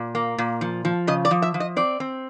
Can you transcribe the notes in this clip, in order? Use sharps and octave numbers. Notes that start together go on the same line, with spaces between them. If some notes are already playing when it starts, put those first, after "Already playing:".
Already playing: A#2
A#3
A#2
F3
F3
C#3 D#5
D5
F3
E5
F3
D#5
C4 D5
C4